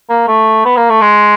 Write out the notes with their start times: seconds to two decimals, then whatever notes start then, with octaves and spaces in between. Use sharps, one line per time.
0.10 A#3
0.28 A3
0.65 B3
0.77 A#3
0.90 A3
1.01 G#3